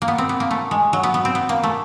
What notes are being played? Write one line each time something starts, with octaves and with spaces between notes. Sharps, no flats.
A#3
B3
C4
B3
A#3
A3
G#3
F#3
B3
B3
C4
B3
A#3
A3